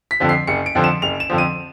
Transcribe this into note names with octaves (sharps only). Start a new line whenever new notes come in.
B6
F2 D3 F3
C7
F#1 C#7
D7
F2 D3 F3
E7
F#1 F7
E7
F2 D3 F3
D#7